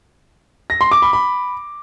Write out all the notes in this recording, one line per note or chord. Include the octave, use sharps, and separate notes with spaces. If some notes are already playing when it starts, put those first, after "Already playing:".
A#6
C6
D6
B5
B5